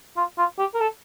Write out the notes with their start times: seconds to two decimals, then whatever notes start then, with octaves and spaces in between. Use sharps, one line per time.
0.17 F4
0.38 F4
0.59 G4
0.74 A#4
0.80 A4